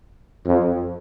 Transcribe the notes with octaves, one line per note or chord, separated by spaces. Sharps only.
F2